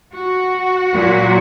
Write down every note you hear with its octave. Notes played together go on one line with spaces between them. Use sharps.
F#4
A#2 F#3